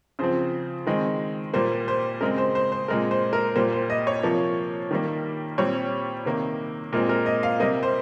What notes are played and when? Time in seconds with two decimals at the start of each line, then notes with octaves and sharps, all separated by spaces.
0.19 C#3 F3 C4 C5
0.87 D#3 G#3 C4
1.54 A#2 G3 A#3 C5
1.88 C5
2.21 C#3 G#3 C4 A#4
2.38 C5
2.55 C5
2.72 C5
2.88 A#2 G#3 C4 A#4
3.11 C5
3.33 A#4
3.56 A#2 G3 A#3 C5
3.73 C5
3.90 D#5
4.07 C#5
4.23 C3 F3 A#3
4.91 D#3 G3 A#3
5.58 A#2 G3 C4 C#5
6.25 C3 D#3 A#3
6.93 A#2 G#3 C4 A#4
7.09 A#4
7.26 D#5
7.43 F5
7.60 C3 G3 A#3 D#5
7.83 C5